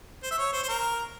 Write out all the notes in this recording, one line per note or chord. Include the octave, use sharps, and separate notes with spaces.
C5
E5
C#5
C5
C5
A#4